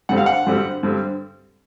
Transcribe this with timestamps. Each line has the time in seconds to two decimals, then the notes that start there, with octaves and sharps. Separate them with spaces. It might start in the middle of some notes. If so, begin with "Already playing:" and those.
0.09 G2 D3 G3 C4 F#5
0.18 F5
0.26 F#5
0.47 G2 D3 G3 C4
0.83 G2 D3 G3 C4